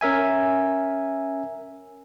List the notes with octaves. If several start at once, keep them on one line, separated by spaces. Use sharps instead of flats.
C#4 A#4 E5 G#5